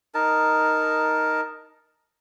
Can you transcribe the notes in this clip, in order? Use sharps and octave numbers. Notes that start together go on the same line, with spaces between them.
D#4 A#4 A5